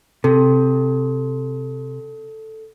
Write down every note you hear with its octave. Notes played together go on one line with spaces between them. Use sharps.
C3 A4